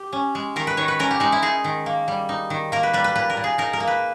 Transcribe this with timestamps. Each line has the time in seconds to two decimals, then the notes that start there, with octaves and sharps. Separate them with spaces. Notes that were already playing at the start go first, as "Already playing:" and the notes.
Already playing: G4
0.13 C#4
0.35 G#3
0.56 D#3 A#4
0.67 B4
0.77 D#3 C#5
0.88 B4
0.99 C#4 A#4
1.11 G4
1.20 G#3 D#4
1.32 E4
1.42 D#4 G#4
1.64 D#3
1.86 A#3
2.08 G3
2.29 D#4
2.50 D#3
2.72 A#3 A#4
2.83 B4
2.93 G3 B4
3.04 B4
3.15 A#2 B4
3.30 A#4
3.37 A#2
3.44 G#4
3.58 D#4 A#4
3.73 A#4
3.80 A#3
3.87 B4